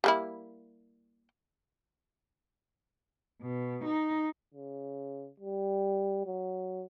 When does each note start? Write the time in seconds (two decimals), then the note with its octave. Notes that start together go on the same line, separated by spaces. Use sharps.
0.04 G3 A#3 E4
3.41 B2
3.85 D#4
4.54 C#3
5.40 G3
6.26 F#3